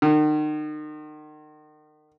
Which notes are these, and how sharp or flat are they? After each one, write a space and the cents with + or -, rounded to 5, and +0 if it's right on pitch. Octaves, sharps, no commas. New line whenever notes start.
D#3 -35